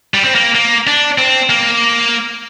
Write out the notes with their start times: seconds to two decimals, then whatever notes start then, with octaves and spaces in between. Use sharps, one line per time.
0.14 G3
0.24 C4
0.35 A#3
0.55 A#3
0.87 D4
1.18 C4
1.50 A#3